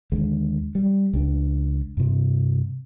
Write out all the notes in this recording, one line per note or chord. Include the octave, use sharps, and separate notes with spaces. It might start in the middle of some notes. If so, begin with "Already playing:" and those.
D#2 D3 G#3
G3
C#2 D4
G2 C3